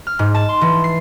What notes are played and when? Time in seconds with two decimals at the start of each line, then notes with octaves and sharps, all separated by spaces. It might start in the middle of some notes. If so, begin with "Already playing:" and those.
0.07 F6
0.19 G#2
0.34 A5
0.49 C6
0.61 E3
0.84 C7